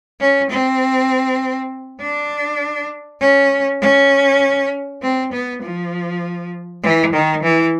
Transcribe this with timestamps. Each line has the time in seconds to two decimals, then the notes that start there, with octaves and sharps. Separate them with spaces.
0.20 C#4
0.50 C4
2.01 D4
3.21 C#4
3.81 C#4
5.02 C4
5.32 B3
5.62 F3
6.83 E3
7.13 D#3
7.43 E3